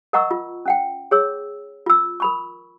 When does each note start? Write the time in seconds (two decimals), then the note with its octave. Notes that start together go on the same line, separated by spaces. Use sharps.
0.13 A#4 D#5 F#5 A#5 C#6 E6
0.31 F4
0.66 C#4 F#5 G5
1.11 G#4 C#5 E6
1.86 F4 E6
2.20 A#4 B5 C#6